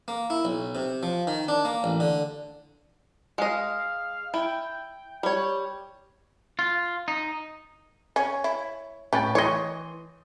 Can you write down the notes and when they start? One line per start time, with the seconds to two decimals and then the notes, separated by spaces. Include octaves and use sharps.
0.08 A#3
0.30 E4
0.45 B1
0.75 C3
1.03 F3
1.27 D#3
1.48 D4
1.65 A#3
1.84 A1
2.00 D3
3.38 G#3 D#5 F5
4.34 E4 G5
5.23 G3 C#5
6.59 F4
7.08 D#4
8.16 C#4 C#5
8.44 E4
9.13 A2 C#4 B4 G5 A6
9.35 E3 C#5 D#5 C6 D#6